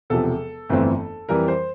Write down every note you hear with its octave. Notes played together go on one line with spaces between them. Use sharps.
E1 E2 C3 F3 A4
G1 F2 E3 A3 C4
F2 E3 G3 A#4
C5